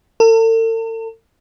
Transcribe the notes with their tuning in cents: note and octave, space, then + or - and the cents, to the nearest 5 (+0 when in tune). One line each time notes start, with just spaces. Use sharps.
A4 +45